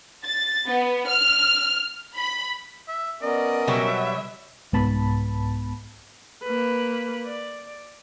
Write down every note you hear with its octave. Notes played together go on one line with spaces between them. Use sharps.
A6
B3
F6
B5
E5
B3 C#4 A#4 D5 D#5
B2 F#3 G3 E5
C2 G#2 B3 A5 B5
A#3 B4
D5